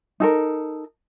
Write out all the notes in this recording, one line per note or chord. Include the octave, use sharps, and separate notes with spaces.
D#4 A4 A#4